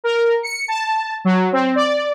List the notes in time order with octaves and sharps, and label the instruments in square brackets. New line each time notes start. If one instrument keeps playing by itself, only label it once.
[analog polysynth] A#4
C#7
A5
F#3
C4
D5